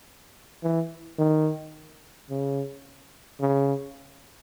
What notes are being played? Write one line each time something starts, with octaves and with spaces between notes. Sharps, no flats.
E3
D#3
C#3
C#3